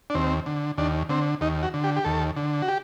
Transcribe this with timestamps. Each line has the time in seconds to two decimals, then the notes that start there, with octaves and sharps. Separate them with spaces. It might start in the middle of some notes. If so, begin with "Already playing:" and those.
0.10 D4
0.15 D#2 C4
0.46 D3
0.78 D#2 D4
1.09 D3 C4
1.41 D#2 D#4
1.63 F#4
1.74 D3
1.84 G4
1.96 G4
2.05 D#2 A4
2.36 D3
2.62 F#4
2.68 G4